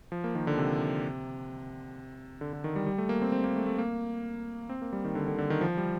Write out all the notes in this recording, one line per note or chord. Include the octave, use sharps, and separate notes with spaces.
F3
A#3
D#3
D3
C3
D3
D3
D#3
G3
G3
A3
A#3
C4
C4
A#3
A3
A3
A#3
C4
A#3
G3
D#3
D3
D3
D3
D#3
F3
G3